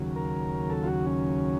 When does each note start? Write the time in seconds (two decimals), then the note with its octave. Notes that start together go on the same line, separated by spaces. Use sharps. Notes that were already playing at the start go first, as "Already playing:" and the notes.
Already playing: D#2 C#3 F#3
0.16 A#4
0.70 A4
0.83 F4
0.87 F#4
1.06 C#4